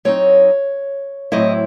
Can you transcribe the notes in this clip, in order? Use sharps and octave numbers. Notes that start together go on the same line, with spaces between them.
F#3 C4 D#4 C#5
A2 F#3 C4 E4 D#5